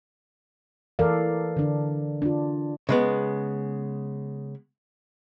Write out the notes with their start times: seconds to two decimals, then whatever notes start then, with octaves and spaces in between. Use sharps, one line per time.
0.99 E3 A4 A#4 D5 F5
1.57 D3 D4
2.22 D4 F4
2.89 C#3 G#3 B3